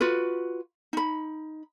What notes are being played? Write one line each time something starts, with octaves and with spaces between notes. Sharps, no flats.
F4 F#4 B4
D#4 B5